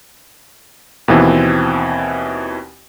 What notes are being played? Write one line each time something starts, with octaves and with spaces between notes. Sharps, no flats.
D#2 B2 E3 C4